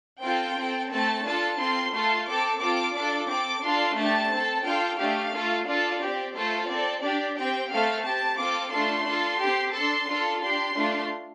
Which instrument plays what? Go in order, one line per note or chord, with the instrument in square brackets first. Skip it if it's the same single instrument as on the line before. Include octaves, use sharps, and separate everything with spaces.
[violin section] C4 F4 A4 G5
C4 A4
A3 C4 A4 A5
D4 F4 A4 A5
C4 F4 A4 C6
A3 F4 A4 C6
C4 A4 D6
C4 F4 A4 D6
D4 F4 A4 D6
C4 A4 D6
D4 F4 A4 C6
A3 D4 G4 A5
C4 A4
D4 F4 A4 G5
A3 D4 G4 F5
A3 F4 A4
D4 F4 A4 D5
C4 G4
A3 F4 A4 C5
C4 A4 D5
D4 G4 D5
C4 G4 G5
A3 C4 A4 F5
C4 G4 A5
C4 F4 A4 D6
A3 D4 F4 A4 C6
D4 F4 A4
C4 G4
D4 A4 C6
D4 F4 A4
D4 G4 C6
A3 D4 F4